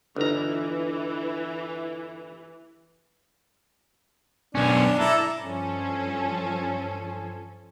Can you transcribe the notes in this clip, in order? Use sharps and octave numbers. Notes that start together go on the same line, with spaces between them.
G1 D3 E3 D#4 A#5
B1 C#4 D4
E4 A4 D5 A#5
G2 F3 C#4 A4